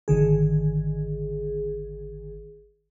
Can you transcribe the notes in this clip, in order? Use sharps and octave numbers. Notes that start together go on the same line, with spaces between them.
G#1 D3 D#3 G#4